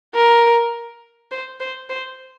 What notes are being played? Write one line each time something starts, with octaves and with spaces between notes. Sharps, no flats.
A#4
C5
C5
C5